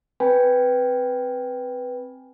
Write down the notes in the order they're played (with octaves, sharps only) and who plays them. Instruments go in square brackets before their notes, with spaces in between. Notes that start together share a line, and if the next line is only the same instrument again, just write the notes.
[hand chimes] C4 B4 G5 G#5 B5